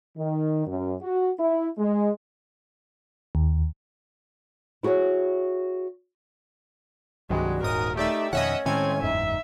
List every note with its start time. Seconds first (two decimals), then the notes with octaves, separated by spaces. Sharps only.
0.16 D#3
0.66 F#2
1.01 F#4
1.39 E4
1.78 G#3
3.35 D#2
4.83 E4 F#4 G#4 A#4 C#5
7.30 C2 G2 D#3 F#3 G#3 F#4
7.63 D#1 G#2 A#4 D#6
7.97 A3 D#4 G4 D5 E5
8.33 F2 B2 D#3 C#4 C#5 D#5 E5 F#5
8.66 A2 D#3 G#3 C4 C#4 G#5
9.02 F#1 E2 G#2 D#4 E5